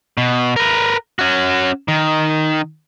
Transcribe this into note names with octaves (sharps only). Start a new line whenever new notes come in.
B2
A#4 B4
C#4 F#4
D#3